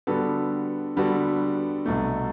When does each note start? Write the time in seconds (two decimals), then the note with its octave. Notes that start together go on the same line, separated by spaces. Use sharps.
0.07 D3 G3 B3 F#4 A4
0.97 D3 G3 B3 F#4 A4
1.86 C2 B2 A3